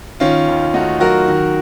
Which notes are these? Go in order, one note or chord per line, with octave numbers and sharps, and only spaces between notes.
D#3 C#4 F4
D#2
A3 D#4 F#4
F#3 F#4 A#4
D#3